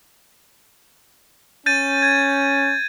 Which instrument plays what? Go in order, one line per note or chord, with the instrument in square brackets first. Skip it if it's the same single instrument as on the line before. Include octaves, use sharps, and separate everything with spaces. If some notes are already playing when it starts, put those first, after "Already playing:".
[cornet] C#4 [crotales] G6 A6 D#7
[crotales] G#6